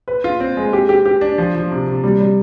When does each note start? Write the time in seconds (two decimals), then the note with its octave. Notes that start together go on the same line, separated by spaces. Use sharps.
0.08 B4
0.24 F4
0.40 C4
0.57 G#3
0.73 G4
0.89 G4
1.06 G4
1.21 D4
1.38 F3
1.55 F3
1.71 C3
1.87 C3
2.04 G3
2.20 G3